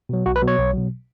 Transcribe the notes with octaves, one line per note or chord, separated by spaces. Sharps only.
B2 F#3
B1 F#4
B4
B2 F#3
C#5
B1
B2 F#3